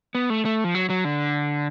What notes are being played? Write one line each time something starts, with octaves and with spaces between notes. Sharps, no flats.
B3
A3
A3
F3
F#3
F#3
D3